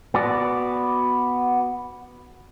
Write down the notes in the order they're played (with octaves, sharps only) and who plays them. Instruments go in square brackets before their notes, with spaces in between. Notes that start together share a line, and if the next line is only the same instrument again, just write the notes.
[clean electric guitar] B3 F#4 D5